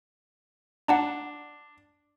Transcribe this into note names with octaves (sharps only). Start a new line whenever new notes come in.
D4 F#5 A5 A#5